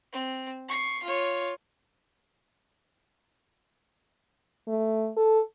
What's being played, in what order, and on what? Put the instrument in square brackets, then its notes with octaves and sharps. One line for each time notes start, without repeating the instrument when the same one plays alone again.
[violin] C4
C#6 C7
F4 C#5
[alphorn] A3
A4